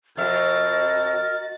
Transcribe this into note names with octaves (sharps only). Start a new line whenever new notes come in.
F2 B2 F#4 A#4 D#5 E5 A6